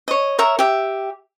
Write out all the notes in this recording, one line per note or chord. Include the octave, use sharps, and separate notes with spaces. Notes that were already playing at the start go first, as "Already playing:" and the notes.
C#5 D#5
A#4 C#5 E5 A#5
G4 E5